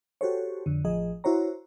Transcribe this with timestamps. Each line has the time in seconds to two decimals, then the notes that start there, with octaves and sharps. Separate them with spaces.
0.21 F#4 G4 A4 C5 C#5
0.66 F2 D3
0.84 A1 F3 G#4 D#5
1.24 E4 F#4 C5 C#5 A#5